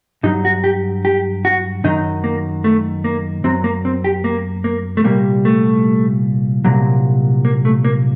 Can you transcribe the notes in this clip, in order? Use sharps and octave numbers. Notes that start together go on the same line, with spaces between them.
G2 F#3 D#4
F#4
G4
G4
F#4
F#2 D#3 F#3 D#4
A#3
A3
A#3
F#2 F#3 C4
A#3
C4
G4
A#3
A#3
A3
C2 A#2 G3 A#3
A3
C2 A#2 F#3
A#3
A3
A#3